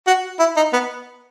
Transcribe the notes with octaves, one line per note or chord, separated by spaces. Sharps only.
F#4
E4
D#4
B3